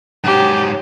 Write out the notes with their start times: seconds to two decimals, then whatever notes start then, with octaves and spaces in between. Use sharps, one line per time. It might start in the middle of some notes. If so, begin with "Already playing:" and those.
0.24 G#2 F#3 G4